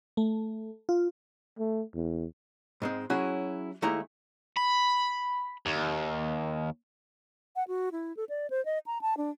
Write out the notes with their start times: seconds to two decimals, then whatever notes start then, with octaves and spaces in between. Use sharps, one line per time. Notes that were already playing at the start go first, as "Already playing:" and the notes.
0.17 A3
0.89 F4
1.59 A3
1.95 E2
2.82 G#2 G#3 C4
3.10 F#3 C#4 E4 F#4 G#4
3.82 D#2 G#3 A3 E4 A#5
4.57 B5
5.66 D#2
7.56 F#5
7.68 F#4
7.92 E4
8.17 A4
8.29 D5
8.50 C5
8.65 D#5
8.86 A#5
9.01 A5
9.17 D4